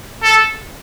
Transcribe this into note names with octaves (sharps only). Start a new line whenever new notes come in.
A4